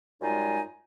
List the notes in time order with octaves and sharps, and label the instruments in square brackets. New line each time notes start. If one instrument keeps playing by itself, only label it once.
[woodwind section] F#2 G3 G#3 D#4 F4 G#5